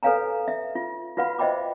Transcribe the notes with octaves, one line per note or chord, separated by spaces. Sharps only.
A4 B4 C#5 F5 G#5 A#5
E5
F4
F4 F#4 B4 F5 F#5 B5
C5 D#5 E5 G5 B5 D6